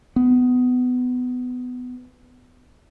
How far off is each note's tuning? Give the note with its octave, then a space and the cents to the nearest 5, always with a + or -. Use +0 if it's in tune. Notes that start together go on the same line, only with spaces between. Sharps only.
B3 +20